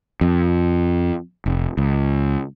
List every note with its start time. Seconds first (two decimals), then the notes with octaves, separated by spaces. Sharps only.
0.21 F2
1.46 F1
1.77 C#2